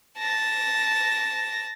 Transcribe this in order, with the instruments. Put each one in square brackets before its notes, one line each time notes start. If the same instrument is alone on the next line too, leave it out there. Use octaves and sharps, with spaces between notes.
[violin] A5 A#6